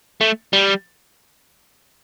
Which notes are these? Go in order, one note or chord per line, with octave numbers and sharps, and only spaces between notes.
A3
G3